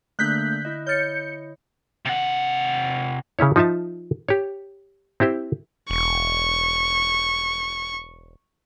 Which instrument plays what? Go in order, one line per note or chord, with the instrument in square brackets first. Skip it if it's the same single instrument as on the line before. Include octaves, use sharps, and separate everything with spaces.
[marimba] D3 [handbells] A3 A#3 D4 [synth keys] F#6 G6 B6
[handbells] E4 D#5
[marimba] C#5 F6 A6 [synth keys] G6 C#7
[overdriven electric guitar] C3 F#5
[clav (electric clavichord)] C#3 C#4 E4 C#5
F3 D#4 F4 E5 A5
G4 C#5
C4 E4 G4 C5
[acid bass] E1 [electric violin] C#6